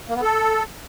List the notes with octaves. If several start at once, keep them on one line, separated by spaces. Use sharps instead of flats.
A#3
B3
A4